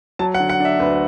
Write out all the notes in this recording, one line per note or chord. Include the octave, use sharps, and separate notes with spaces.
F#3 A5
F#5
D3
F#5
D4 E5
D2 B4